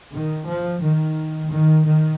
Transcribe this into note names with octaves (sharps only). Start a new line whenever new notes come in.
D#3
F3
D#3
D#3
D#3